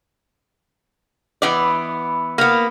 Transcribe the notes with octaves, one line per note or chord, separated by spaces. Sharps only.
E3 B3 D5
A#3 B3